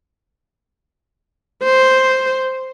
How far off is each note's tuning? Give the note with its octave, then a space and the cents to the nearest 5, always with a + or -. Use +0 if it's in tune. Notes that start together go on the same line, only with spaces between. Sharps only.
C5 +0